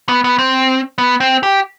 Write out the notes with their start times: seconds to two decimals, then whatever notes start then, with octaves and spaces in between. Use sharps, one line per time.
0.09 B3
0.24 B3
0.39 C4
0.98 B3
1.20 C4
1.43 G4